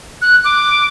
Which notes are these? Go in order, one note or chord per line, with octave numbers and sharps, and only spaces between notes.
F#6
D6